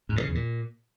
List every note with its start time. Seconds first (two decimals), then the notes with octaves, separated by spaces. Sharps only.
0.09 G#2
0.16 G2
0.22 C#3
0.28 E2
0.35 A#2